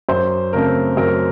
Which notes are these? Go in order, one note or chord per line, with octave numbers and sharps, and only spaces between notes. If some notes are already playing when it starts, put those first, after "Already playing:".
F#2 C5
C#3 A3 C4 A#4
F#2 A#4